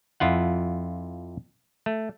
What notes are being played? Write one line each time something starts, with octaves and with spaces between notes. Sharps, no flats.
F2 E4 F4 F#5
A3